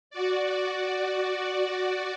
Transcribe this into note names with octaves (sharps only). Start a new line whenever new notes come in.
F#4 D5